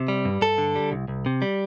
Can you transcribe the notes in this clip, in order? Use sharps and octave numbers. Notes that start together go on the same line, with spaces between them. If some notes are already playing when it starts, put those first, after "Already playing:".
Already playing: C3
G3
G2
G2 A4
D3
G3
C2
C2
C3
G3